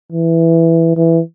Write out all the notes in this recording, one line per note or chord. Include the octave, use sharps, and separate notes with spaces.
E3
E3